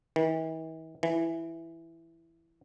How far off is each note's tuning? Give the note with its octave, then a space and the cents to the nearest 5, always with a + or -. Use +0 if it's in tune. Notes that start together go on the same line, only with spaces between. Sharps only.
E3 -45
E3 +5